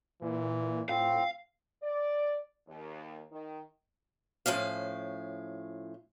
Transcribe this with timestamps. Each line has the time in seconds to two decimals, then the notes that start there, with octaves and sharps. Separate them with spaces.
0.22 A#2 E3
0.89 A2 C4 F4 F5
1.82 D5
2.67 D#2
3.31 D#3
4.46 A2 F3 C#4 F5